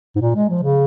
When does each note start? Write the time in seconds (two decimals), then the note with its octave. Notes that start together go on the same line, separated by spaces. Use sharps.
0.16 G#2
0.21 A#2
0.36 G#3
0.50 F3
0.63 C#3